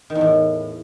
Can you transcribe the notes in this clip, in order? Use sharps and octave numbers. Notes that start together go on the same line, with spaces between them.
D#3
E2
A2